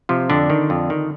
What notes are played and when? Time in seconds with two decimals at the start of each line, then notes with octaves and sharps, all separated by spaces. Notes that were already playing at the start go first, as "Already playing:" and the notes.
0.09 C3 F3
0.30 F2 D3 D4
0.50 D#3
0.70 F2
0.90 D#3